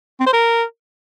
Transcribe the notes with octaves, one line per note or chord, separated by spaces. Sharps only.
C4
C5
A#4